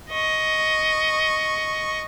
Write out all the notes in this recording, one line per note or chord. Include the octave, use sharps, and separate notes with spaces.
D#5 C#6